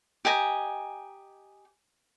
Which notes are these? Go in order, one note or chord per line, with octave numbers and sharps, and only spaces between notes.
G4 D#5 G#5 A#5